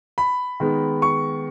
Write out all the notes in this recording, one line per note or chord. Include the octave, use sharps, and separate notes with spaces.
B5
D#3 G#3 B3
C#6